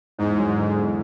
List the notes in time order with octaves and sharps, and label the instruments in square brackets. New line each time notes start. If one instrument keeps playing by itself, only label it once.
[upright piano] E2 [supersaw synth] G#2
[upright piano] F#3
D3
E2